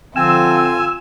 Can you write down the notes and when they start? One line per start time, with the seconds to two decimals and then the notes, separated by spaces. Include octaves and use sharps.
0.16 D3 F3 C4 F4 G#5 E6